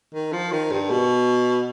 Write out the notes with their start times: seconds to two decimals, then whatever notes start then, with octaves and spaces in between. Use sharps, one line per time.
0.14 D#3
0.32 F3
0.52 D#3
0.71 G2
0.90 B2